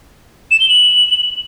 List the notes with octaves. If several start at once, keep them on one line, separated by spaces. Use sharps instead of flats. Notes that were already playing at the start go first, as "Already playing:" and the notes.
E7
G7
F#7